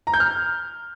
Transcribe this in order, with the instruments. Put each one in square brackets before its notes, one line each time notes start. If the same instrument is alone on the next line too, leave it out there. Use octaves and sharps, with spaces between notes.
[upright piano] A#5
G6
F6